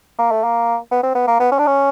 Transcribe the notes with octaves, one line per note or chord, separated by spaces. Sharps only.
A#3
A3
A#3
B3
C4
B3
A#3
B3
C#4
D4
C#4